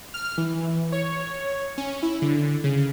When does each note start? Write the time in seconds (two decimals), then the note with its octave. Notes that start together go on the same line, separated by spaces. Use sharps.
0.14 F6
0.38 E3
0.92 C#5
1.78 C#4
2.03 E4
2.22 D3
2.64 C#3